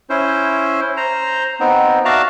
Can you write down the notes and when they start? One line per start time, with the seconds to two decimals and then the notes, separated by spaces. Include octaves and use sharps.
0.10 C#4 E4 C5
0.97 C5 A#5
1.60 B3 C4 D#4
2.05 F#4 D5 E5 F5 A5 A#5